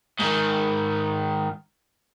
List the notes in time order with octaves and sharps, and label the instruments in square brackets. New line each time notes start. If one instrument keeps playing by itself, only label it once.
[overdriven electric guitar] G#2 D#3